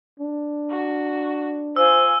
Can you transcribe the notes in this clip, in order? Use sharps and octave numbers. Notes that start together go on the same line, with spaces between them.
D4
F#4
F4 C5 G#5 E6